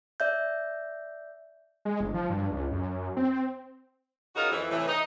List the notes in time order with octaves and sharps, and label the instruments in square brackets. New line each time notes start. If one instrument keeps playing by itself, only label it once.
[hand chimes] D5 E5 G6
[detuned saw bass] G#3
G1
F3
G2
C#2
F#2
C4
[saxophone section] C#3 D#4 F4 F#4 A#4
F2 E3
A2 C3 E3
D#4